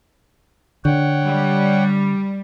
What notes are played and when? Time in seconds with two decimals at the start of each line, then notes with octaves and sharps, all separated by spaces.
0.85 D3 C#5 F#5 G5
1.25 G3